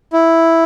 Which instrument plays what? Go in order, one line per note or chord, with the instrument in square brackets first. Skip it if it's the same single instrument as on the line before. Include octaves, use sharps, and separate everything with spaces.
[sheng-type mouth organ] E4